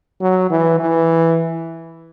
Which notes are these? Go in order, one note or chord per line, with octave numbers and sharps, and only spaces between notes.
F#3
E3
E3